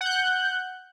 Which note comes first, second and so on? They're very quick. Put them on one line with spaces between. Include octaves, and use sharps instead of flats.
F#5 G6 F#6